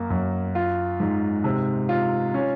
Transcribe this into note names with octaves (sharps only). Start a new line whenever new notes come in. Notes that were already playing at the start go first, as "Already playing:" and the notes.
Already playing: F#2 A#3
F#2
F4
G#2
C3
F4
C#4